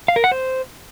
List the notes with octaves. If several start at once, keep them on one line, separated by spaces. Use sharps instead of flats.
F5
A#4
F#5
C5